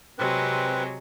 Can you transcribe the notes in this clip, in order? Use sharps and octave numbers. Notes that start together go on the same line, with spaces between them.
C3 F#3 G#3 C4 B4